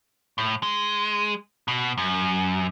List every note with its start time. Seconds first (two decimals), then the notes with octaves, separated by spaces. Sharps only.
0.38 A2
0.63 G#3
1.68 B2
1.98 F#2